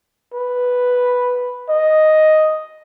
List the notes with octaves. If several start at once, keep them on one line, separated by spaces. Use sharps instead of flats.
B4
D#5